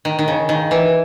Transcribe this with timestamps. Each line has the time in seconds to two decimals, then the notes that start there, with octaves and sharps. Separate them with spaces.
0.05 D#3
0.19 D#3
0.28 C#3
0.49 D#3
0.71 E3